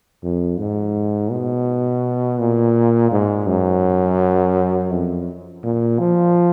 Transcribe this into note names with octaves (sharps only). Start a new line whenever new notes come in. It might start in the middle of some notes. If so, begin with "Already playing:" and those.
F2
G#2
B2
A#2
G#2
F#2
F2
A#2
F3